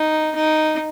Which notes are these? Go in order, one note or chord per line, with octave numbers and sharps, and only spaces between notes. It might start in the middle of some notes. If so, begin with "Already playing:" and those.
Already playing: D#4
D#4